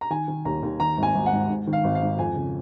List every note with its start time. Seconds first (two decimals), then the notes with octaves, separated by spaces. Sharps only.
0.01 A#5
0.10 D#3 G#5
0.28 D#3
0.45 D#2 A#5
0.63 D#2
0.80 D#3 A#5
0.97 G#1
1.03 G#5
1.14 G#1
1.26 F#5
1.32 G#2
1.49 G#2
1.67 D#3
1.73 F5
1.84 G#1
1.95 F5
2.02 G#2
2.19 F2 G#5
2.36 C#3